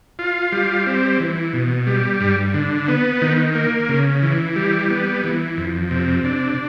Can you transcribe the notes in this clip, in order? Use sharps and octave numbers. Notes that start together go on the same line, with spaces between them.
F4
G3
C4
E3
B2
G3
G2
D3
B3
D#3
A#3
C#3
E3
G3
B3
E3
F2
C3
D4